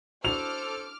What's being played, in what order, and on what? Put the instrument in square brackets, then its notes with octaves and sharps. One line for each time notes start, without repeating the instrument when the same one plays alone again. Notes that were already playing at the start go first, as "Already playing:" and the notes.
[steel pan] D4 E4 F#4 [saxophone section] A4 C5 [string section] D6 F6 [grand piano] F7